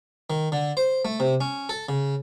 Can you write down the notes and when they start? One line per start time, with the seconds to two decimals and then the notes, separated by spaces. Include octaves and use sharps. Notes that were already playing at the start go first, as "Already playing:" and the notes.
0.30 D#3
0.52 D3
0.77 C5
1.05 A3
1.20 C3
1.41 C#4
1.69 A4
1.89 C#3